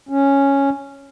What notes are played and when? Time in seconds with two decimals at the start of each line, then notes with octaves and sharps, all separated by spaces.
0.09 C#4